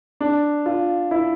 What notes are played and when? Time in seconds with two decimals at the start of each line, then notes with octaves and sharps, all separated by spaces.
0.21 D4
0.66 F4
1.11 E4